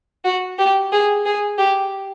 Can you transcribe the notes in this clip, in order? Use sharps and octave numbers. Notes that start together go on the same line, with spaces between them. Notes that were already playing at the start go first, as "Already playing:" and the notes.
F#4
G4
G#4
G#4
G4